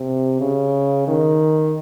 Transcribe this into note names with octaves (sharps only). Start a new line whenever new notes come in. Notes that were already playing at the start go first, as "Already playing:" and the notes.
Already playing: C3
C#3
D#3